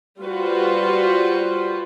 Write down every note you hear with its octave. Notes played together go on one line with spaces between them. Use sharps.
G3 F4 F#4 B4 C5